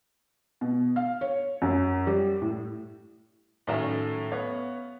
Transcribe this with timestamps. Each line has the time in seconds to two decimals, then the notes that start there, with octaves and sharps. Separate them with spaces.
0.61 B2
0.96 F5
1.21 C#5
1.62 F#2
2.07 G3
2.41 A2
3.67 A2 D#3 F#3 A3 C#4
4.31 B3 C#5 F5